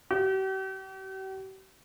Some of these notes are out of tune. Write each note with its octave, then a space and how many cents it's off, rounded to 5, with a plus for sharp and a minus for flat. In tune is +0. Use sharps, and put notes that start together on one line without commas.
G4 -45